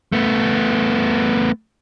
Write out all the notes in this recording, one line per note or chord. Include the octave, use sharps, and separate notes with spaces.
A3 B3